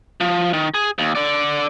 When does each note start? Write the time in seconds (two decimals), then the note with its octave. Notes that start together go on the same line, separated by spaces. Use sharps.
0.21 F3
0.53 D#3
0.74 G#4
0.99 D#2
1.15 D3 D5